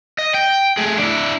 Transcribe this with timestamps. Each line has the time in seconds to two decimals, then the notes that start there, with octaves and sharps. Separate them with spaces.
0.18 D#5
0.34 G5
0.77 A3 G#4
0.98 D4 E4